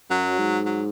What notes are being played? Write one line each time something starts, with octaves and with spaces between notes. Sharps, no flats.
F#2 F#3
G#2
F#3